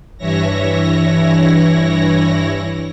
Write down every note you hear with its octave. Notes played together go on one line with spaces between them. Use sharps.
G2 E3 E4 C#5 A#6